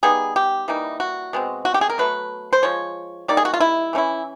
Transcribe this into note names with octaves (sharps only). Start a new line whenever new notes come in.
G3 B3 D#4 G#4
G4
E3 G3 A#3 D#4
F#4
B2 G#3 C4
F#4
G4
G#4
A#4
B2 F#3 A3 B4
C5
F3 G#3 C#5
G3 A#3 D#4 D5
G#4
F#4
F4
E4
E3 A3 C#4 E4